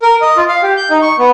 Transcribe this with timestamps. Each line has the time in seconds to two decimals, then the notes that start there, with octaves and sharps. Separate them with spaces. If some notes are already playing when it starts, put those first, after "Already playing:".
0.02 A#4
0.22 D#5
0.37 F4
0.48 F5
0.63 G4
0.77 G6
0.90 D#4
1.02 C#6
1.19 B3